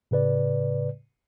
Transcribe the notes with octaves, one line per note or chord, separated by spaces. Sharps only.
A2 C#3 B4 D5